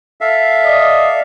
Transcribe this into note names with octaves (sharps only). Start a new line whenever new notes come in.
A4 E5 F5
D5 D#5